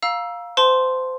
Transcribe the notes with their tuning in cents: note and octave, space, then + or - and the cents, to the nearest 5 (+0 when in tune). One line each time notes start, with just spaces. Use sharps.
F5 +10 A#5 +25 E6 +5
C5 -25 A5 -10 C6 +0